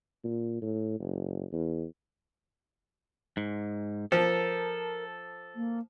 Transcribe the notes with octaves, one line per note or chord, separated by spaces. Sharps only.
A#2
A2
F#1
E2
G#2
F3 A4 A#4
A#3